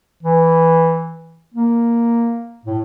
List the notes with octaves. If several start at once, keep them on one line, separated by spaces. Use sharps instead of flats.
E3
A#3
A2